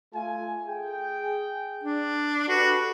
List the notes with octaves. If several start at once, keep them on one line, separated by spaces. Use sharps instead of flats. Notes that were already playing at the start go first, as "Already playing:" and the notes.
A3 F4 G#5
G#4 G5
D4
F#4 G4 A4 B4